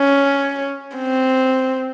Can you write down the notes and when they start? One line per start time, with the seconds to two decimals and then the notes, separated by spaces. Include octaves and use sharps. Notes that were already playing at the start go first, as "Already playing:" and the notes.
Already playing: C#4
0.97 C4